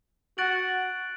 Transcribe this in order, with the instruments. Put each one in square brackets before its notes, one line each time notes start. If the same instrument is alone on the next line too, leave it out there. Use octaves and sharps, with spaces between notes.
[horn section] F#4 [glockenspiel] F#6 A6 D7 F#7